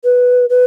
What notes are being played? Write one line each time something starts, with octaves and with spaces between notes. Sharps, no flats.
B4
B4